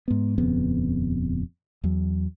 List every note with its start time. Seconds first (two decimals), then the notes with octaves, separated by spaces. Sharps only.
0.08 G#2 B3
0.38 D#1 F2 C#3 B3
1.84 E2 F#3